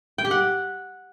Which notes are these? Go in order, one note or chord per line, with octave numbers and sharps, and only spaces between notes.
G5
G4
F#5